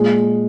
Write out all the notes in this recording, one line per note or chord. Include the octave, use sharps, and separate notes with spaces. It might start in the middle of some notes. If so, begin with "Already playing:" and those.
Already playing: A#2 G#3